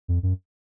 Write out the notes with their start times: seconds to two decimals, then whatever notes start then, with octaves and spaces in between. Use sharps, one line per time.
0.08 F2
0.23 F#2